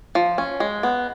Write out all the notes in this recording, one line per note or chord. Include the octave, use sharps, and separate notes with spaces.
F3
C#4
G#3
B3